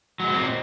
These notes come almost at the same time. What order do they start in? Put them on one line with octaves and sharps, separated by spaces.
F#3 G#3 B3 C4 A#2